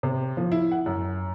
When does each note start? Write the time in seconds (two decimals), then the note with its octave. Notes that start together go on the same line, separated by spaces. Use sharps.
0.03 C3
0.37 F3
0.52 E4
0.72 F#5
0.86 F#2